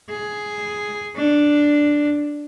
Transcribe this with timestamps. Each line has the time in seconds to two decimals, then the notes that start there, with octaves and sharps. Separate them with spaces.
0.10 G#4
1.16 D4